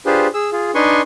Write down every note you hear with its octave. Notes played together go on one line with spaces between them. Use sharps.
D4 F4 G4 G#4 B4 C5
G#4 E6
F4 G#4
D4 D#4 B4 G#5 C6 C#6